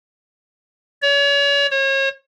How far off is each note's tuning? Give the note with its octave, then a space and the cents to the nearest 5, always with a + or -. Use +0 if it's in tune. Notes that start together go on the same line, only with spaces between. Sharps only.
C#5 +35
C#5 -35